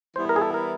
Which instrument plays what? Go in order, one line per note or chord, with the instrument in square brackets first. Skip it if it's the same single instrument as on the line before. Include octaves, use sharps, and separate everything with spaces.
[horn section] E3 G3 B3 E4 [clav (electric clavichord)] C5
[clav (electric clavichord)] A#4
G#4
A4
A#4